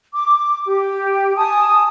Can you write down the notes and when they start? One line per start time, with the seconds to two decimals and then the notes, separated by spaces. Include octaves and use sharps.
0.13 D6
0.65 G4
1.36 G#5 A5 D#6